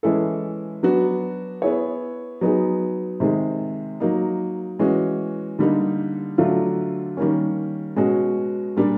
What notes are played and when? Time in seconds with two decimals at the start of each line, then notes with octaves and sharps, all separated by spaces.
0.03 E3 G#3 C#4 E4 A4
0.83 F#3 B3 D4 F#4
1.62 B3 E4 G#4 C#5
2.41 F#3 B3 D#4 G#4
3.20 C3 D#3 G#3
4.00 F#3 A#3 D#4
4.79 E3 G#3 C#4 F#4
5.59 D3 G3 A#3 D#4
6.38 D3 F#3 A3 D4 F4
7.17 D#3 G3 A#3 C#4
7.96 B2 G#3 C#4 F#4
8.77 A#2 G3 A#3 D4